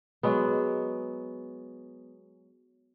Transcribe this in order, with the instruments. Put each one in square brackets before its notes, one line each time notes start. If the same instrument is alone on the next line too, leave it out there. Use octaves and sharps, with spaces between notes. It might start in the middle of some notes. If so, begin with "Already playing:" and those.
[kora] F#3 G#3 B3